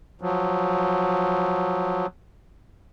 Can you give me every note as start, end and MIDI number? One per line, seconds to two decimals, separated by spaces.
0.21 2.06 53
0.21 2.06 54